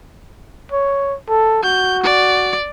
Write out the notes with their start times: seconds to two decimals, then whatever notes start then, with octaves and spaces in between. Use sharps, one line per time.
0.72 C#5
1.29 A4
1.64 F#4 G6
2.04 D5